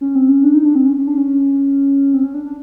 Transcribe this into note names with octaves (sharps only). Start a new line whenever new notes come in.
C#4
C4
C#4
D4
D#4
D4
C4
C#4
C#4
D4
C#4
C4
C#4
D4
D4